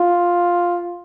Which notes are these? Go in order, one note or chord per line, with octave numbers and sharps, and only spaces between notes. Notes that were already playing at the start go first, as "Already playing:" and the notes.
Already playing: F4